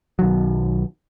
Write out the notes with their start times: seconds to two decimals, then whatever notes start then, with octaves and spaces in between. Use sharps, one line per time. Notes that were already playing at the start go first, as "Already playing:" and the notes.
0.19 B1 D#3 F#3